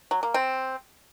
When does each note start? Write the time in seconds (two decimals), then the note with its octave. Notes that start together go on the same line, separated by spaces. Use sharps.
0.11 F#3
0.23 A#3
0.34 C4